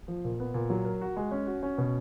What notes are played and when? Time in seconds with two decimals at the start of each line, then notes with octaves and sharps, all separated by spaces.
0.08 F3
0.24 A#2
0.40 B3
0.54 A#2
0.70 F#3
0.85 A#4
1.01 F#4
1.17 G#3
1.31 C#4
1.47 F#4
1.63 C#4
1.78 B2